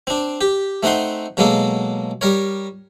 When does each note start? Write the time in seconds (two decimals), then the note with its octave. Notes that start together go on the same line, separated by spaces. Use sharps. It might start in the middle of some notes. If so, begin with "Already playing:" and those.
0.07 C4 D4
0.41 G4
0.83 A3 C4 D#4 F#5 C6
1.37 B2 F#3 G#3 A#3 A4
2.21 G3 A#4 C#5